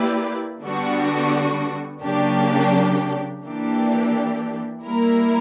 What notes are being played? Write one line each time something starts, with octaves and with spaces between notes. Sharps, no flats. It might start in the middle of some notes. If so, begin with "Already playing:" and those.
Already playing: A#3 E4 G4 B4 D5
D3 G3 B3 D4 F#4
C#3 F#3 A#3 D4 G4
E3 A#3 D4 G4
G3 A#3 E4 A#4